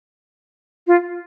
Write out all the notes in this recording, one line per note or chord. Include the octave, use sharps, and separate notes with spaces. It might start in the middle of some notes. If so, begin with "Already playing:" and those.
F4